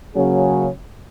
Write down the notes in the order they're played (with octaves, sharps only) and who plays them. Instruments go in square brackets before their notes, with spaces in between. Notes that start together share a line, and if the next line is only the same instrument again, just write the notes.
[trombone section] C#3 F#3 A#3 C#4 G#4